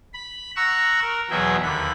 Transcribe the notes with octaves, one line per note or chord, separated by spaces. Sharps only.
B5
F#5 A#5 C#6 E6
A#4
E2 B2 F#3 G#4 E5 G5
D#2 D3 B5